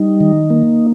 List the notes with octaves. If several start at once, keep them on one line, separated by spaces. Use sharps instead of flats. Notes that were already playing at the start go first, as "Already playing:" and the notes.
Already playing: G3 D#4
D#3
A#3